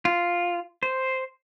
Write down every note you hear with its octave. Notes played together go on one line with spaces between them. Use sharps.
F4
C5